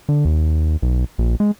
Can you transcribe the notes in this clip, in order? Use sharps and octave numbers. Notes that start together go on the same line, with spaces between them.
D3
D#2
B1
A#1
G#3